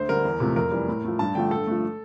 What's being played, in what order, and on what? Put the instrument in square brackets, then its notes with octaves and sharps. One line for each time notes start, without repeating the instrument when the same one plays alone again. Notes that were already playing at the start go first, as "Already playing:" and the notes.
Already playing: [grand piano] D2 C5
D3 G3 A#4
E2
C3 F3 A3
F2 A#4
E3 G3
A2
F3 A3
G2 A5
D3 F3 A3 G5
G2 A4
F3 A3